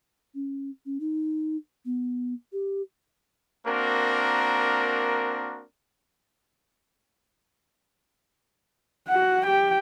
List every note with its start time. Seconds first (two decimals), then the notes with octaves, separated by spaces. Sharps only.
0.35 C#4
0.86 C#4
1.00 D#4
1.85 B3
2.53 G4
3.67 A#3 C4 D4 F#4 A#4
9.09 F#4 F#5
9.46 G4 G5